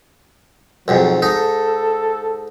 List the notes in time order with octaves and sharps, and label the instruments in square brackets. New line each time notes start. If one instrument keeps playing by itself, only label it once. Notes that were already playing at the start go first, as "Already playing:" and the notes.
[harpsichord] B1 F2 G#2 [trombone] F#3
[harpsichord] G#2 D#4 [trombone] A4